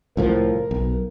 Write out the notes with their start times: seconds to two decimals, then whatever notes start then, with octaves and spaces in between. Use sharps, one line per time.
0.17 C2 A2 F3 A#4
0.71 B1